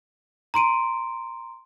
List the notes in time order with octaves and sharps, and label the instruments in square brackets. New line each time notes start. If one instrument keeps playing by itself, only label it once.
[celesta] A#5 C6 D7 D#7